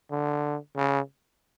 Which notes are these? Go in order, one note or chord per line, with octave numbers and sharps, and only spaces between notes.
D3
C#3